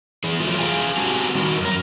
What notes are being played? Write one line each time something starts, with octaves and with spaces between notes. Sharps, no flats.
E3 G#4
E3 F#3 A3 F4
G#4 F5 G5 G#5
C4 F#4 G4 F#5 G#5 A5
D#3 G3 F#4 A#4
F#2 A#4